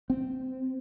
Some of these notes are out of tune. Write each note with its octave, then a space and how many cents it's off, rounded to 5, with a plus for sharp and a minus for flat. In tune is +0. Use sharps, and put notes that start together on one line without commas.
C4 -10